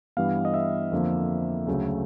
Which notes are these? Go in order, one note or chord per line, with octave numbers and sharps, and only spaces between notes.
G2 E3 G3 B3 F5
D#5
E5
F2 D3 F3 A#3
D2 C#3 F#3 A3